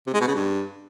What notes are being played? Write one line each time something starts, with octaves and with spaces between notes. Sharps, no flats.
C3
G#3
B2
C#3
G2